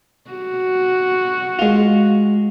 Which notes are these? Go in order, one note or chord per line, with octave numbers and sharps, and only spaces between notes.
F#4
G#3 F4